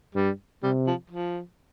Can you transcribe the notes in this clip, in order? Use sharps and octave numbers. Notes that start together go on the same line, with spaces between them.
G2 G3
C3 G3
F3
F3